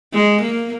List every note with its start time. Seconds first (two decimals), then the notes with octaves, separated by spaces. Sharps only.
0.13 G#3
0.42 A#3